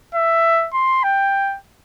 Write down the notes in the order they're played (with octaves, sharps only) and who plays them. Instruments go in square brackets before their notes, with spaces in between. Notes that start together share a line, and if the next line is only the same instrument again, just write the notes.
[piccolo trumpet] E5
C6
G5